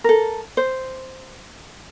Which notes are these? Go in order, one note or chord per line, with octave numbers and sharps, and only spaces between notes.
A4 A#4
C5